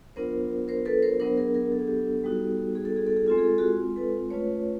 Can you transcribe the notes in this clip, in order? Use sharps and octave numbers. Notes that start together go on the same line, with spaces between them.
F#3 B3 D4 F4 A#4 C5
A#4 C5
A4 B4
A#4 C5
F#3 B3 D4 A#4 C5
G#4 A#4
G#4 A#4
A4
G#4
G4 A4
G3 B3 D#4 F#4
G#4
A4
G#4
A4
G#4
G#3 C4 F4 A4
G#4
A4
F#4 G#4
A4 B4
A3 C#4 F4 B4 C#5